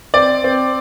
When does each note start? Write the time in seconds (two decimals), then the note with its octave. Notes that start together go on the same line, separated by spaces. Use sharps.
0.14 C4 D5
0.44 C4